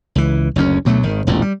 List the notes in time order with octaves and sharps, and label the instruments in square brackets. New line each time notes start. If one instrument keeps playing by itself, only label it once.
[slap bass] C#2 E3
F#1 D2 B2 C#4
D2 B2 F#3 A3
G#1 D#3
E1 A1 A#2
G3